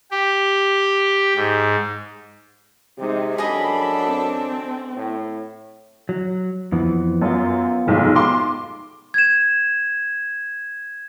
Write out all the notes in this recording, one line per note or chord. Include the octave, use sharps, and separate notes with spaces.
G4
G#2
C3 G#3 D#4
F#2 D4 G#4 A4 D#5 B5
C4
A2
F#3
F2 E3 B3
F#2 B3 F4
F1 B1 G#2
C6 D6
G#6 E7